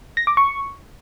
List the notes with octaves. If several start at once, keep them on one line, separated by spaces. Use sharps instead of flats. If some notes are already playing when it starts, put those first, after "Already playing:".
A#6
D6
C#6